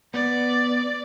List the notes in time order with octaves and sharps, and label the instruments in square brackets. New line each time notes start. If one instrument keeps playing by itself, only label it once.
[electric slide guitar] B3 [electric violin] D5